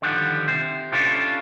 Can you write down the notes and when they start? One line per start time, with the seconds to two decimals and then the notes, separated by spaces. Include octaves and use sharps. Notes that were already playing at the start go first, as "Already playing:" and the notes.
0.02 D3 D#3 F3 G3 F#5
0.48 C3 C5
0.92 C#4 D4 E4 F4 G4 A4